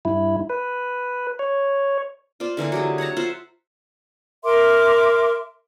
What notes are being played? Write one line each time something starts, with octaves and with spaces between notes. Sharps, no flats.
G2 E4
B4
C#5
F4 C5 D5
D3 E3 A#3 E4
F#3 G4 G#4
C#5 F#5 A5 A#5
F4 C5 E5 F#5
A#4 E5 C6 D6